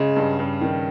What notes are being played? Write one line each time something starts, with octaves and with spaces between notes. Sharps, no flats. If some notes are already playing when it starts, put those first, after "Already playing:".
Already playing: C#3 G#3
G2
G2
D#3